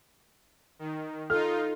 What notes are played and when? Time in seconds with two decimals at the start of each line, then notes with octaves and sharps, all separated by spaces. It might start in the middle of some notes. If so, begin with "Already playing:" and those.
0.79 D#3
1.30 D#4 F4 A4 F6